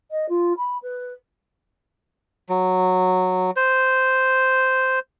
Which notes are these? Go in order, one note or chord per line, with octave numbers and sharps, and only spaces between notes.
D#5
F4
B5
B4
F#3
C5